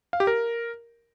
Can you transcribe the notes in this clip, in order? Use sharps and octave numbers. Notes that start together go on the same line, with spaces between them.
F5
G4
A#4